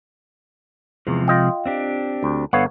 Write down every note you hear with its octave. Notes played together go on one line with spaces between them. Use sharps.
E2 C3 F3 G#3
F4 D#5 G5
C4 D4 G4
D2
G1 B3 A4 C#5 F5 F#5